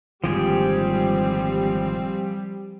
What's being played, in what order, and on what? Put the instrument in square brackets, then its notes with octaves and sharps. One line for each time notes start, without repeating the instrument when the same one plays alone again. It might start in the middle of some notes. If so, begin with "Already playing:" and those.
[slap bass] G#1 A#2 D3 [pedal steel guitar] F3 G4 G#4 [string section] G3 [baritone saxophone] C4